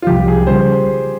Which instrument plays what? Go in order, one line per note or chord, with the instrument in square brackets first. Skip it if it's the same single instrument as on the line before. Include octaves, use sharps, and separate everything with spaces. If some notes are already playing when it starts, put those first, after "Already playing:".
[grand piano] F4
[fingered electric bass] C2 C3 F3 [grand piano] G4
[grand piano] G#4
[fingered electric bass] C#3 G3 C#4 [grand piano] C5